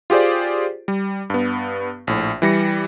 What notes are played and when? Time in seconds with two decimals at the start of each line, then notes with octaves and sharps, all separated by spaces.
0.10 F4 G4 G#4 C5 D5
0.88 G3
1.30 G2 B3
2.07 A#1 A2
2.42 E3 G3 A#6 C#7